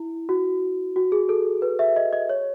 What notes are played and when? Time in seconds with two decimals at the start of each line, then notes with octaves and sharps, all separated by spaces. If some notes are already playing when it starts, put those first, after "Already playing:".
Already playing: E4
0.29 F#4
0.96 F#4
1.12 G#4
1.29 A4
1.62 B4
1.79 E5
1.96 D#5
2.13 D#5
2.29 C#5